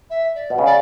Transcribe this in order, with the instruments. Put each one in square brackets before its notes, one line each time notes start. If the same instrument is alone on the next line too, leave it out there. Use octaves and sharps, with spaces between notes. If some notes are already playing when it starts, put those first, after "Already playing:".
[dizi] E5
D5
[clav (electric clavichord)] B2
C#3
[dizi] D5